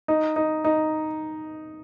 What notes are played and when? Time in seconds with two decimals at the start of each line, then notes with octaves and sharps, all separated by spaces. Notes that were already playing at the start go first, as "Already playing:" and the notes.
0.08 D#4
0.36 D#4
0.64 D#4